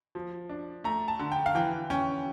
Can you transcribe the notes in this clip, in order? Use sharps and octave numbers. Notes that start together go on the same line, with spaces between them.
F3
D4
A3 A#5
A5
D3
G5
F5
E3 G5
C#4 G5